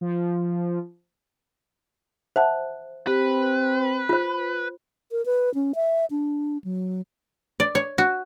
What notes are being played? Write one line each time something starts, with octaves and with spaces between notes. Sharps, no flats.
F3
C5 E5 F#5 A5
C4 G4 B4
F4 C5
A#4
B4
C#4
E5
D4
F#3
D5
C#5
F#4